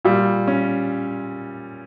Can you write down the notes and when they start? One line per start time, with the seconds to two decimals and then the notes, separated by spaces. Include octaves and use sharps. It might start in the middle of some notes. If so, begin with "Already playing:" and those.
0.05 A#2 G3
0.48 C#4